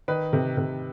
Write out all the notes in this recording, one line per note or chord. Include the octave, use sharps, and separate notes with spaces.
D#3 B4
C3
C3